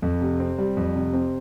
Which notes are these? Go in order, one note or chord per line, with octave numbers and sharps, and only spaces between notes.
F2
C3
C4
G3
F2
C3
C4